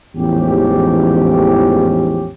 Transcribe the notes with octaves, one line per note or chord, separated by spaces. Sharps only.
A1 E2 G#2 F3 C#4 G4